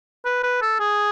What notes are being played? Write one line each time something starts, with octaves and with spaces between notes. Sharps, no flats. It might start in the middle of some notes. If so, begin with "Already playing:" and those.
B4
B4
A4
G#4